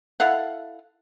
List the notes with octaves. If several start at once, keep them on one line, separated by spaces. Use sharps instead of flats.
E4 A4 F5 F#5